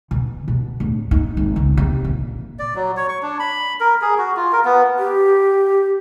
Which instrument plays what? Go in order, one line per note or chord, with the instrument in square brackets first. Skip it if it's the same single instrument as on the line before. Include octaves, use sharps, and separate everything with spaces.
[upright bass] B2
B2
D1
D#4
G#1
C#2
C3
A#1
[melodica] D5
F#3
C#5
C#6
D4
B5
A#4
G#4
F#4
F4
A#4
B3
[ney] G4